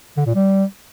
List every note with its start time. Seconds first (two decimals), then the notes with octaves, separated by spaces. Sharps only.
0.17 D3
0.26 A#2
0.35 G3